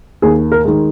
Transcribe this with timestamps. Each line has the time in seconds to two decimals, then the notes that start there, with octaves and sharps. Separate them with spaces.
0.22 D#2 G#4
0.52 A#4
0.65 D#3 G#3